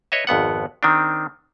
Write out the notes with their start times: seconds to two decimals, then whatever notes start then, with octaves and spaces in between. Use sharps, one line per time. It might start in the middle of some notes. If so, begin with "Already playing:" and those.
0.12 B4 C#5 D#5 E5
0.27 G#1 F2 B3 F#5
0.83 D#3 C4 D4